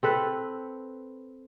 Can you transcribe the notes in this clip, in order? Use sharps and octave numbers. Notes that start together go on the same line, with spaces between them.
C4 A4 B4